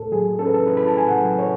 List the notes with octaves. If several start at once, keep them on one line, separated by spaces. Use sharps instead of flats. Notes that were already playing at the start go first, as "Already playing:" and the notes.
Already playing: A2 A4
F#3 G#4
C#4 A4
B4
A4
E4 B4
B5
A5
A2 G#5
F#5
F#3
C#5